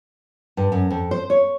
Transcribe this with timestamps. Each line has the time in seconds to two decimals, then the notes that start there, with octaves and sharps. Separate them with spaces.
0.57 G2
0.72 F#2
0.90 F2
1.11 C5
1.30 C#5